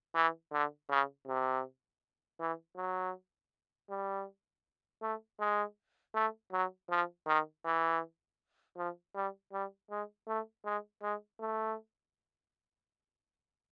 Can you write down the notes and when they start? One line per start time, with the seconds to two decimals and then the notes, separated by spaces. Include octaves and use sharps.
0.15 E3
0.52 D3
0.90 C#3
1.27 C3
2.40 E3
2.77 F#3
3.90 G3
5.02 A3
5.40 G#3
6.15 A3
6.53 F#3
6.90 F3
7.27 D#3
7.65 E3
8.77 F3
9.15 G3
9.53 G3
9.91 G#3
10.27 A3
10.65 G#3
11.03 G#3
11.40 A3